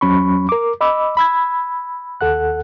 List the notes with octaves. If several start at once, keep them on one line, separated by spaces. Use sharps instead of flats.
E2 F#3 C#4 B5 C#6
A#4 D6
D#5 B5 D6 E6
B5 E6 G#6
D#2 A4 F#5 F#6